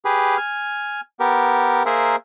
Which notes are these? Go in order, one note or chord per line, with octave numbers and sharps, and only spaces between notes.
G4 G#4 B4
G#5 F6
B3 G4 A#4
A#3 G#4 A#4 C5 E5